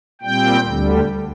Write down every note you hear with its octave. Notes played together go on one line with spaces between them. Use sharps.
A#2 G3 C4 G5
D2 D3 G3